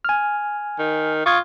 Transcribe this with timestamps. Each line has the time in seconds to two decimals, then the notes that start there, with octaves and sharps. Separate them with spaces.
0.05 G#5 F6
0.79 D#3
1.26 F4 C#6 D#6 G#6